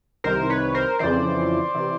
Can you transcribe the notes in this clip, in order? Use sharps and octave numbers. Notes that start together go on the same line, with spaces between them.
C2 C3 D#3 A#4 C5
B4 C#5
A#4 C5
F2 C#3 E3 C5 D5
C3 E3